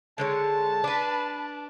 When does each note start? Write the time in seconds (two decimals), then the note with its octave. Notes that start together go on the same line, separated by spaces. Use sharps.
0.18 D3 G#3 C#5 A5
0.84 D4 B4